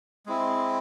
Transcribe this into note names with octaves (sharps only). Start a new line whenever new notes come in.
G#3 C4 E4